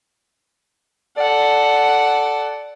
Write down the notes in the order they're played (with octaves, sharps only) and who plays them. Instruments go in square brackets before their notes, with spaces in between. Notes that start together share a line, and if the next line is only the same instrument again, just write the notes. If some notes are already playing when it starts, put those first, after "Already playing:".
[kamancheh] A4 F#5 [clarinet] D5